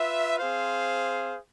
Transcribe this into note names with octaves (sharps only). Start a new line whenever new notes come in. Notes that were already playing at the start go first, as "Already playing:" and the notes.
Already playing: F4 B4 E5
C4 G#4 C5 F5